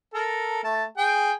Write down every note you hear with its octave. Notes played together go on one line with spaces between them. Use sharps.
A4 A#4
A3 A5
G#4 G5